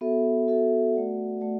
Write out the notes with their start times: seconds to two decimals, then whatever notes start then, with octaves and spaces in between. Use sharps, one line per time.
0.01 B3 F#4 A4 E5
0.48 B3 F#4 A4 E5
0.93 A3 F#4 D5 F#5
1.40 A3 F#4 D5 F#5